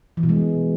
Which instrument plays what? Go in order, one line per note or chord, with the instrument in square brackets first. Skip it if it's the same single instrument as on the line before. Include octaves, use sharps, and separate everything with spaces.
[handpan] E3
B2
G#3